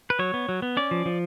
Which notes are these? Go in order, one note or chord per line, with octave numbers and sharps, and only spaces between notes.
B4
F#3 C#5
B3
F#3
B3
C#4 D5
F3
F3